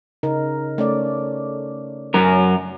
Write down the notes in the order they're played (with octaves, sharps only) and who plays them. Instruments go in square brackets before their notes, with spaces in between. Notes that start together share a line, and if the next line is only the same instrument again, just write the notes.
[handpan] C#3 D#4 A#4
A3 C#4 D5
[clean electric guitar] F#2 A#4